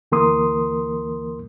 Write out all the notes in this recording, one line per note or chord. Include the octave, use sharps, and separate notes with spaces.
D2 E3 A#3 A#4 C6 D#6